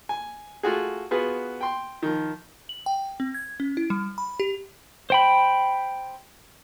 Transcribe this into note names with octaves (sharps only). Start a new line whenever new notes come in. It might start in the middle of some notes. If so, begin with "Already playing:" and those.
G#5
A3 F4 F#4 G#4
B3 F4 F#4 G#4 B4
G5 C6
D#3 F3
F#7
G5
C4
G#6
C#4
E4
G3
B5
G4
C5 G5 B5